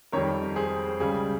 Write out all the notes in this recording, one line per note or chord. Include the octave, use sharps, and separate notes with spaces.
F2 D#3 G3 A#4 C#5
G#4 C5
C#2 C#3 G3 G#4